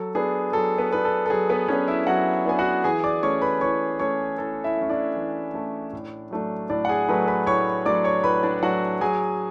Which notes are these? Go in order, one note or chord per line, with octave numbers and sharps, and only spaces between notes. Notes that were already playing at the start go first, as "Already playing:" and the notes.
Already playing: F#3 A4
B3 D4 G#4
F#3 A4
B3 B4
B3 D4 B4
A4
A4
F#3 G#4
B3 B4
B3 C#4 D4 C#5
E4 E5
F#3 F#4 F#5
B3 D4 G#5
F#4 F#5
E3 G#4 G#5
D5 D6
A3 C#4 C#5 C#6
B4 B5
E3 C#5 C#6
A3 C#4 C#5 C#6
E3 A4 A5
E4 E5
A3 C#4
D4 D5
E3
A3 C#4
A2
F#3 A3 D4
A2 D4 D5
F#5
G#4 G#5
F#3 A3 D4 B4 B5
B4 B5
A2 C#5 C#6
F#3 A3 D4 D5 D6
C#5 C#6
A2 B4 B5
D4 D5
F#3 A3 D4 F#4 F#5
F#3 G#4 G#5